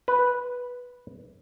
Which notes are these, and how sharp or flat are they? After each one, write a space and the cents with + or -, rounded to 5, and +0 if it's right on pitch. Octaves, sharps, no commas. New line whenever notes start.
B4 -5